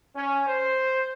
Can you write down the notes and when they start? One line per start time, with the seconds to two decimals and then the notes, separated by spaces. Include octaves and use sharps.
0.15 C#4
0.48 C5